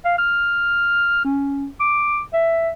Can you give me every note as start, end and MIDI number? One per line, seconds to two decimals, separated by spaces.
0.05 0.15 77
0.18 1.20 89
1.25 1.67 61
1.80 2.20 86
2.33 2.70 76